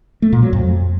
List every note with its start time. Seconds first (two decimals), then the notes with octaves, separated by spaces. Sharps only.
0.22 A3
0.32 A#2
0.43 F#3
0.53 F2